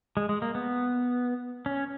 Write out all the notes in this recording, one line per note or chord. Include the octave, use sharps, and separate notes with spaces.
G#3
G#3
A#3
B3
C#4